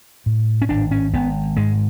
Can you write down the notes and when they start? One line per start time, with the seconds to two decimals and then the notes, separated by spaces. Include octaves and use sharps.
0.26 A2
0.62 C#4
0.69 G#1 D4
0.91 C#4
1.13 G#1 B3
1.57 G#2 G#3